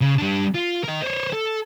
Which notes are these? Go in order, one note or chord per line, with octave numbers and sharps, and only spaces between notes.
C#3
G3 D4
F4
A#4 D#5
C5 C#5
A4